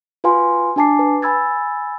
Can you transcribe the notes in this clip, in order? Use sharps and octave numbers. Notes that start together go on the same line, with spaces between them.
F4 F#4 B4 F5 G#5 C6
D4 F#4 G#5 A5 D6 C7
B4
G#5 B5 E6 G#6 A6